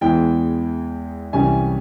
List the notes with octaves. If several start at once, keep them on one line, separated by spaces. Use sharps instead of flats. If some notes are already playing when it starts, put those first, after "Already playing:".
E2 E3 G#3 E4 G5
C2 C3 E3 G3 C#4 G#5